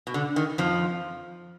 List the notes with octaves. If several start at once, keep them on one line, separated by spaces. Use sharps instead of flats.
B2
D3
D#3
F2 F3